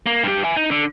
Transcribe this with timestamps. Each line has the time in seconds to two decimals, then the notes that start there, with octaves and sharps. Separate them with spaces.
0.06 A#3
0.23 G2 G4
0.44 E5 G#5
0.56 D#4
0.71 D3